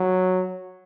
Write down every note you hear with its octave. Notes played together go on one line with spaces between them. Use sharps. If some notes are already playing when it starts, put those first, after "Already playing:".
Already playing: F#3